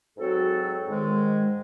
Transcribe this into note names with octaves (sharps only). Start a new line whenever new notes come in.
G#2 F#3 C4 F#4 A4
G#2 D#3 G#3